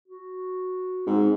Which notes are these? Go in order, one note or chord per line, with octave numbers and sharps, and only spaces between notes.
F#4
G#2 C4